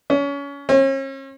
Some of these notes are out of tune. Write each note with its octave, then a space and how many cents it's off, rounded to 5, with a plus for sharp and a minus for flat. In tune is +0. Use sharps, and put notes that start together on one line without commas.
C#4 +30
C#4 -40